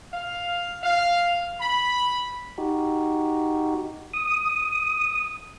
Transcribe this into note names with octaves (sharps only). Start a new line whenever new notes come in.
F5
F5
B5
D#4 F#4 G4
D#6